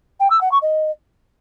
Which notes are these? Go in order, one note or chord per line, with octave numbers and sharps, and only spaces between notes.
G5
E6
F#5
C#6
D#5